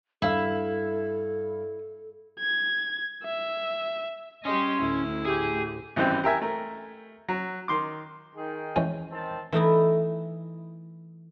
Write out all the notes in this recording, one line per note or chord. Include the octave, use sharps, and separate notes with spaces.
G2 E4 A4 F5 E6
G#6
E5
G3 C#4 G4 D#5 C6
D2 A2 E4
G4 G#4
G#1 F#2 E3 G3 C4 G4
G4 A#4 E5 G#5
A3 A#4
F#3
D#3 C6 D6
D#3 G#4 G5
E3 G#3 C#4
D#3 C4 A5
E3 A3 D#4 E4